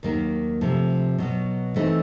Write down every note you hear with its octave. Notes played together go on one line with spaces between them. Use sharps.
D#2 D#3 F#3 A#3
C3 F3 A3
B2 F#3 B3
E3 A3 C4 D#4